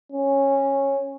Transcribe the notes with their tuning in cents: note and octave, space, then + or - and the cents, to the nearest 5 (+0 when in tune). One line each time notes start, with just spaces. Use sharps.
C#4 -10